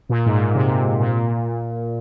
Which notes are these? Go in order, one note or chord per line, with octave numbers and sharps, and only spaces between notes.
A#2
G#2
A#2
C3
A#2